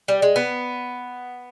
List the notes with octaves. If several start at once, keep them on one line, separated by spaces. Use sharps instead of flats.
G3
G#3
B3